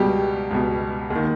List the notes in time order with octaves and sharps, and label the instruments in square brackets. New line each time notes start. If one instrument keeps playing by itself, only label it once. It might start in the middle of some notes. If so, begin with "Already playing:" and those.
Already playing: [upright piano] C#2 B2 G3 G4
C#2 B2
D#2
D#3